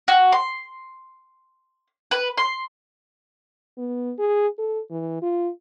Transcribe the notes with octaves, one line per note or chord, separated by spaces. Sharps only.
F#4
C6
B4
C6
B3
G#4
A4
E3
F4